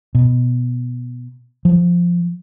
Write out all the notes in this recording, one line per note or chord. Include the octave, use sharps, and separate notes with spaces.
B2
F3